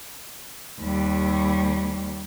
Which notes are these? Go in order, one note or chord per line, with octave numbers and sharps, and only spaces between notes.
D#2 G3